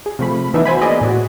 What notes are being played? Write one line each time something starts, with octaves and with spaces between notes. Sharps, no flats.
G#4
C3 F3 A3 B5
E3 B3 D4 D#4 B4 E5
F#4 C5 G#5 B5
A#3 B3 G#4 D5 D#5
A2 F#4